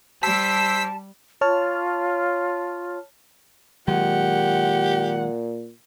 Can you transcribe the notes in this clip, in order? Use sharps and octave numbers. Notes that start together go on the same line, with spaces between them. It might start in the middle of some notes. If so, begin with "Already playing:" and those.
G3 C5 A5 E6 B6
F4 C#5 A5 F6
A#2 D#3 F#3 G#3 G4 F#5